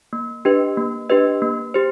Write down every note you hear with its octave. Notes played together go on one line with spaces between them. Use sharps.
A#3
D4 G4 B4 D#5
A#3
D4 G4 B4 D#5
A#3
G4 C5